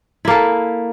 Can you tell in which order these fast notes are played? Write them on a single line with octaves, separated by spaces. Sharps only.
E4 A#3 A4